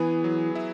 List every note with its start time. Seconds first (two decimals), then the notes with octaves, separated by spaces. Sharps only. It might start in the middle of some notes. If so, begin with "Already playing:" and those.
Already playing: E3 B3 G#4
0.24 F#3
0.55 E4